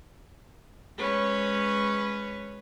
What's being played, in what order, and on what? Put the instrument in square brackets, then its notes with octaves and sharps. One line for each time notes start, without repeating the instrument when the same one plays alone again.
[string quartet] G#3 C#4 B4 C#5